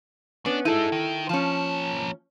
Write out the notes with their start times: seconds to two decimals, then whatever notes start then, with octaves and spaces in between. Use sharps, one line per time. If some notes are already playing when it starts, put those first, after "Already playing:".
0.46 B3 C#4 D4
0.65 D#4 E4 G#4 A4
0.92 D#3
1.29 F3 A#3 C#4 A5